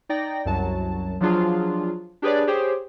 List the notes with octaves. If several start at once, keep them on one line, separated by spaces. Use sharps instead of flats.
D#4 D5 G5 A#6
C2 F#2 F#3 A5
F3 F#3 D4 F4 G#4
D4 G4 G#4 B4 C#5 D5
G4 G#4 C5 C#5 G5